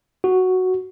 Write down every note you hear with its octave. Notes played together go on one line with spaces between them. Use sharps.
F#4